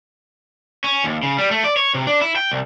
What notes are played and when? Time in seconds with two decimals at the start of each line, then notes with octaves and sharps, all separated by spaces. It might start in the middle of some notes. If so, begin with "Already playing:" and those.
0.84 C#4
1.04 D#2
1.23 C#3
1.38 G3
1.51 A3
1.64 D5
1.77 C#5
1.94 C3
2.07 D4
2.21 E4
2.36 G5
2.51 C2